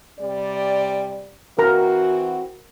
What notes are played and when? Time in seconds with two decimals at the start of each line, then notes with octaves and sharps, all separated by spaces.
0.20 C3 G3 D5
1.59 E3 C4 F#4 A#4 A#5